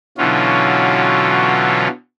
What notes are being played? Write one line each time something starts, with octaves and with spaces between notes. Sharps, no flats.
B2 D3 E3 F#3 C#4 F4